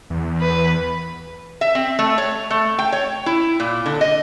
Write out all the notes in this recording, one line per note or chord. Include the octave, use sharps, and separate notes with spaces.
E2
B4
E5
C4
A3
C#5
A3
G5
C#5
E4
A#2
D3
D#5